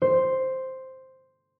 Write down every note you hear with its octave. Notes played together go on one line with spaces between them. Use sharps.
C5